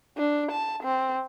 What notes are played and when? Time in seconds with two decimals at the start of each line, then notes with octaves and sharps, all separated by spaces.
0.17 D4
0.52 A5
0.83 C4